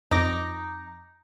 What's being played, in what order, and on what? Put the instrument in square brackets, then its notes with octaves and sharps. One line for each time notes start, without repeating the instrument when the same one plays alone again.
[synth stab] F2 D6 A#6 [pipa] D#4